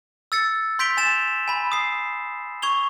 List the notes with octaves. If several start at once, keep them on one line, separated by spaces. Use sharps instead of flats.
E6 A6 C#7
C6 G6 B6 D7 F7 G7
G#5 A6 E7 F7
G#5 B5
D#6 C7
C#6 G#6 F7 G7